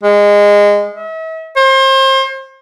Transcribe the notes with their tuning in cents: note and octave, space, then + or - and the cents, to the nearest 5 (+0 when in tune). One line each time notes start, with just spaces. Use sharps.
G#3 -20
E5 -40
C5 +35